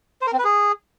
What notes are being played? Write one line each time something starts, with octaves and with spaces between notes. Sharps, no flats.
C5
A#4
C4
B4
G#4